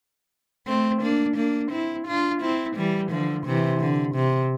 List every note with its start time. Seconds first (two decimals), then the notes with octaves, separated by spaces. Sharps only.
0.67 A3 C4
1.02 A#3 D4
1.37 A#3 D4
1.71 C4 E4
2.07 D4 F4
2.42 C4 E4
2.76 E3 G3
3.11 D3 F3
3.46 C3 E3
3.80 D3
4.16 C3